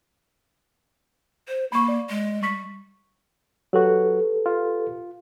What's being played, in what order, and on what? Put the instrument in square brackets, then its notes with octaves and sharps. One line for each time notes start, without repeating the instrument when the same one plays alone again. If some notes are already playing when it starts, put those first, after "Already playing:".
[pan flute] C5
[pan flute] A#3 [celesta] B5 C#6
[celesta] D5
[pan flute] G#3
[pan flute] G3 [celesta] C#6 B6
[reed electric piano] F#3 F#4 [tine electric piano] G4 A4 B4
[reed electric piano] F4